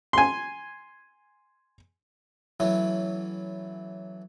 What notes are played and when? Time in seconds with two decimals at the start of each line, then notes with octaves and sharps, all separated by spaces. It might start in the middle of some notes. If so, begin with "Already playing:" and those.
0.13 G#5 C6
2.60 E3 F#3 A3 C#4